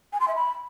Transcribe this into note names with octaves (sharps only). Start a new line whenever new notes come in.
G#5
C6
E5
B5